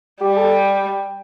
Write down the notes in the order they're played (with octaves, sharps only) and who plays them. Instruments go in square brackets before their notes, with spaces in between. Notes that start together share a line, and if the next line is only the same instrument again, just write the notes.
[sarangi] G3 [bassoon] G4
[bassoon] A4